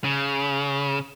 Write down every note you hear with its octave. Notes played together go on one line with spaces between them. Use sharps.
C#3